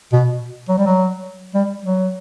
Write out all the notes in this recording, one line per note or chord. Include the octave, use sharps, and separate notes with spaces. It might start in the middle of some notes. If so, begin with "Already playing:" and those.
B2
F#3
G3
F#3
G3
F#3